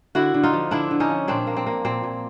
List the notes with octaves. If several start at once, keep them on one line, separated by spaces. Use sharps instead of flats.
D3 E4 F#4
D3
D#4 F4
F3
D3 D4 E4
D3
C#4 D#4
F3
A#2 C4 D4
A#3
C4
A#3
A#2 C4
A#2